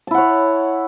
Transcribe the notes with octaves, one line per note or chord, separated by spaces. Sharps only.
E4 C#5 F#5 A5